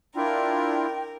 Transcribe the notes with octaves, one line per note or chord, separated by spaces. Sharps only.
D4 E4 F4 A#4 G5